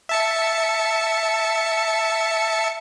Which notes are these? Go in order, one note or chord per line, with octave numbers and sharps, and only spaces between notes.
E5 A5 C#7